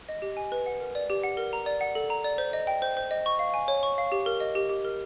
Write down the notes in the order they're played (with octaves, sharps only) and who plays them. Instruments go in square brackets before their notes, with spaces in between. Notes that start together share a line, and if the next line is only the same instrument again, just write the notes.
[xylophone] D#5
G4
G#5
B4
F#5
A#4
D5
G4
F#5
A#4
A#5
D5
F#5
A4
A#5
D5
C5
D#5
G5
C5
C5
D#5
C#6
F5
G#5
C#5
C#6
F5
G4
A#4
D#5
G4
G4
A#4